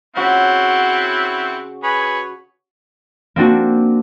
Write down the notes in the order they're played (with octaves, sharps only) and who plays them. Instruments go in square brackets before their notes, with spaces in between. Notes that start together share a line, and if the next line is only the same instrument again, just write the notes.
[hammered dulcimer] C#3 F#4 [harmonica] C4 E4 F#5
[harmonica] G#4 B4 C#5
[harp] A#3 C4 D4 F#4